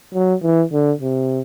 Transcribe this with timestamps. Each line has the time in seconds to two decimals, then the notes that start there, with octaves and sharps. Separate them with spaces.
0.14 F#3
0.43 E3
0.72 D3
1.01 C3